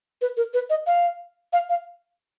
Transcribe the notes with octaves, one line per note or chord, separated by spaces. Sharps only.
B4
A#4
B4
D#5
F5
F5
F5